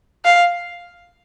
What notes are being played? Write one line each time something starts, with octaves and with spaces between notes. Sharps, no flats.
F5